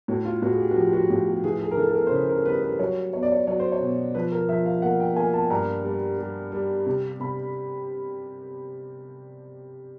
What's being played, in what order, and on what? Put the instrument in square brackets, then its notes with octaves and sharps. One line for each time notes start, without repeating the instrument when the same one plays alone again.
[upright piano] A2 F#4
F4
A2 F#4
G#4
G4
F#4
F3 G4
F#4
A2 G4
G4
E3 G#4
G#4
A#4
E3 A4
A4
A#4
C5
C#3 B4
A#4
G3 B4
B4
F#3 C#5
B3 C#5
D5
C#5
F#3 C#5
C5
C#5
B2
F3 B4
A#4
F3 E5
F5
A#3 F#5
G5
A#3 G#5
A5
G2 A#5
G3
G3
G3
C3
C3 B5